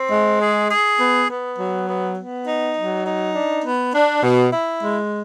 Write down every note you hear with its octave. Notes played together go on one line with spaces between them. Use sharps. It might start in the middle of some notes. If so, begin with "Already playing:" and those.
Already playing: C4
G#3
G#4
G#4
B3
B3
F#3
B3
B3
D#4
F#3
D#4
D4
B3
D4
B2
E4
G#3